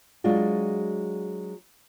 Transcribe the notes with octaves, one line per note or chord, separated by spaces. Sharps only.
F#3 G#3 D4 F4 F#4